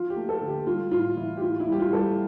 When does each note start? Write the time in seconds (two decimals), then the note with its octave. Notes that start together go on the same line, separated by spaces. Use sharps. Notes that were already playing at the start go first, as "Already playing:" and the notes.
Already playing: F3 F4
0.10 G4
0.16 A3
0.29 A4
0.41 D3
0.48 G4
0.66 G3 F4
0.91 A2 F4
1.16 E3 E4
1.37 G4
1.41 A2 F4
1.60 E4
1.66 G3
1.72 G4
1.79 F4
1.92 G3 A4
1.98 G4